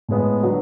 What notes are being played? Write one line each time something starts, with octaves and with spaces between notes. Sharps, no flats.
A2 G#3 B3
D3 F#3 B3